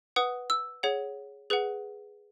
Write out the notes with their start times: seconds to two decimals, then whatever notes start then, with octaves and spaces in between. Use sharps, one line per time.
0.16 B4 F#5 D#6
0.50 E6
0.83 G#4 C#5 F#5
1.50 G#4 B4 F#5